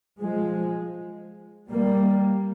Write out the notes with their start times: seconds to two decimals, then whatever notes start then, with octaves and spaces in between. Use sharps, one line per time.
0.20 F3 G#3
1.70 G3 A#3